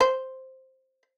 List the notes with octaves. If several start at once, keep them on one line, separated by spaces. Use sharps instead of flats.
C5